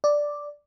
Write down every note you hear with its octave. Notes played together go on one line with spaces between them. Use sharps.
D5